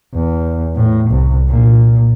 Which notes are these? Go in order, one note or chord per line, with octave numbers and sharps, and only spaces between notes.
E2
A2
C2
A#2